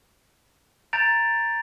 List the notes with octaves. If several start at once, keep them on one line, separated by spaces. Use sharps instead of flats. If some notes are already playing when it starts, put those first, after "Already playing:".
A#5 G6 A6 D7 F7